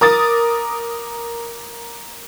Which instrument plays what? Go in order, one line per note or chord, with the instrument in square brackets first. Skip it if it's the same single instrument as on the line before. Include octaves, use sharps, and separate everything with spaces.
[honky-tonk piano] A#4 D6 D#6 A6